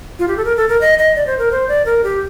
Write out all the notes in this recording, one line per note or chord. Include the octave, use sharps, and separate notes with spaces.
F4
G4
A4
A#4
A4
A#4
D#5
D#5
D5
C5
A#4
C5
D5
A#4
G4